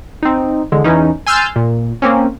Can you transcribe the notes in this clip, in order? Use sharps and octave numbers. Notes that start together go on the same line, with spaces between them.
C4 D#4
E2 D3 G#3
E2 E3 C#4 D#4
G#5 C6 E6 F6 G6 A6
A#2
A#3 C4 C#4